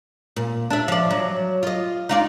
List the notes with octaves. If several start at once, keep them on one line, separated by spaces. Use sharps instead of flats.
A#2
D4 E5
F3 D5
F#3
F4 D#5
D#4 F4 D5